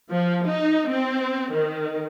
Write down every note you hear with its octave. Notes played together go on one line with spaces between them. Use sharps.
F3
D#4
C4
D#3